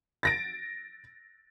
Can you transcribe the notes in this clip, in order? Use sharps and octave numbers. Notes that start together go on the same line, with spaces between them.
A6 A#6 D7